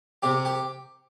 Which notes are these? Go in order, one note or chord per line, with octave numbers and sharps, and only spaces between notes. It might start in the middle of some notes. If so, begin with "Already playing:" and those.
C3 G4
G4